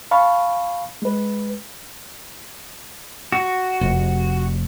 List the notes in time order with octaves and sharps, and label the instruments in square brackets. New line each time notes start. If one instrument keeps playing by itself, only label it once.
[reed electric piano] F5 A5 B5 C#6
G#3 B4
[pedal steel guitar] F#4
[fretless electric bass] F1